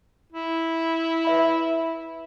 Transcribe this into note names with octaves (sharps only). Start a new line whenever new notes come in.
E4
B4 E5 B5